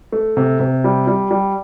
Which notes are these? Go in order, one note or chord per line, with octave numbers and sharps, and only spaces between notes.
A3
C3
C3
G3
G3
G3